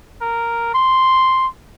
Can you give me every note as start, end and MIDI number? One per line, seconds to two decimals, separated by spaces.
0.22 0.73 70
0.75 1.47 84